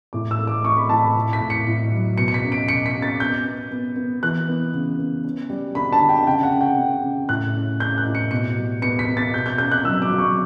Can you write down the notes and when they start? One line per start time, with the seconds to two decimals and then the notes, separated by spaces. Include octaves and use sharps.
0.13 A2 D6
0.31 E6
0.39 A3
0.47 D6
0.64 A3 C#6
0.77 B5
0.89 A2 A5
1.03 B5
1.16 A2
1.33 B6
1.41 A2
1.50 C#7
1.67 A2
1.92 F#3
2.18 B2 C#7
2.28 C#7
2.34 B6
2.43 C#4
2.52 D7
2.68 B2 C#7
2.86 B6
2.95 C#4
3.02 A6
3.20 B3 G6
3.45 B3
3.71 B3
3.96 B3
4.23 E3 F#6
4.48 B3
4.73 C#3
4.99 B3
5.24 C#4
5.50 G3
5.75 D3 B5
5.93 A5
6.01 D3
6.09 G5
6.27 C#3 G5
6.43 F#5
6.53 C#3
6.61 G5
6.78 C#3
7.03 C#3
7.29 A2 F#6
7.55 C#4
7.80 C#4 G6
7.98 F#6
8.06 A2
8.15 C#7
8.31 B2 C#7
8.57 G3
8.82 B3 C#7
8.99 B6
9.08 B3
9.17 A6
9.33 B2 G6
9.46 G6
9.58 C#4 G6
9.71 F#6
9.85 F#3 E6
10.02 D6
10.10 F#3
10.19 C#6